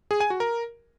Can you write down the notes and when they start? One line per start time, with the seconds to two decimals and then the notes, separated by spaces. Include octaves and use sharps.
0.11 G#4
0.20 G#5
0.30 F#4
0.40 A#4